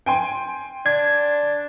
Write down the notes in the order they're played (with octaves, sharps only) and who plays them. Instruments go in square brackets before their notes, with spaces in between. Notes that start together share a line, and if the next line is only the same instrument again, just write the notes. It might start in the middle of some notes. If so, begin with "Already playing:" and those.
[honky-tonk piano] G5 G#5 C6
[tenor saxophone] D4 [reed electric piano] G#6